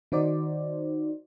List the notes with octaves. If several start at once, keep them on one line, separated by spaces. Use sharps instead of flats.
D#3 D#4 F#4 C5 D5